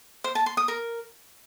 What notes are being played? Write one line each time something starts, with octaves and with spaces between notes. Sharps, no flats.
C5
A5
C6
D#6
A#4